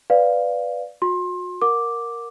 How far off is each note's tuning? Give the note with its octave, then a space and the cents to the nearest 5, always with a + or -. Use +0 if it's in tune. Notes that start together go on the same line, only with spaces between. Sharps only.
B4 +10 D5 +0 F5 +0
F#4 -40 C6 +25
A#4 +0 F#5 -25 D6 +0